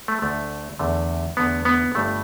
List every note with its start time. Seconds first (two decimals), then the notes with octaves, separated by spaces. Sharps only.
0.08 A3
0.22 D2 D3 A3
0.79 E2 D3 A3
1.37 E2 D3 A3 B3
1.65 B3
1.95 G1 G2 G3 A3